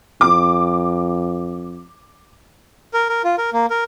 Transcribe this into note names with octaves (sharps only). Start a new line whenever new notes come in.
F2 D6
A#4
A#4
F4
A#4
A#3
A#4